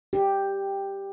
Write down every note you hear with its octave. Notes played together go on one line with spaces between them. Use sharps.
G4